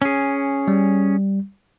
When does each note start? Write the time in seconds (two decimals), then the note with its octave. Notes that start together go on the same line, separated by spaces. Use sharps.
0.02 C#4 G#4
0.68 G3